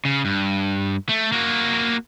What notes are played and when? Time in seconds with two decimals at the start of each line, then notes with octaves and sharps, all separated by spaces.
0.05 C#3
0.25 G2
1.09 A3
1.32 A#3 F#4